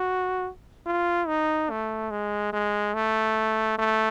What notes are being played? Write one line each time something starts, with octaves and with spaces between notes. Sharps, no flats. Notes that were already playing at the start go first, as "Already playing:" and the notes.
Already playing: F#4
F4
D#4
A3
G#3
G#3
A3
A3